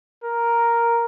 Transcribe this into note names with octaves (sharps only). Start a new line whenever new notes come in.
A#4